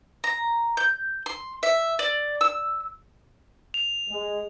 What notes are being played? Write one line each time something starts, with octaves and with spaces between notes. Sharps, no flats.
A#5
G6
C6
E5
D5
E6
F7
G#3